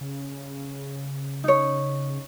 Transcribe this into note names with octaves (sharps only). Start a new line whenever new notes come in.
C#3
D#4 C#5